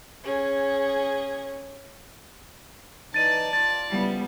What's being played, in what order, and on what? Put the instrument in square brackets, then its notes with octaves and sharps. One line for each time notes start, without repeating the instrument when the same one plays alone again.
[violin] C#4 G#4
[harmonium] E3 D#4 [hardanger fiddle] D5 A5 [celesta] A6 D#7
[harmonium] F4 [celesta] A6
[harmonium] C#3 F3 E4 [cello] G3 B3